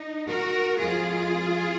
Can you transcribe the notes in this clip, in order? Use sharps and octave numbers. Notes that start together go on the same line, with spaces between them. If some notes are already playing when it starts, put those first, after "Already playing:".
Already playing: D#4
F#4 A#4
F2 F3 G#3 F4 G#4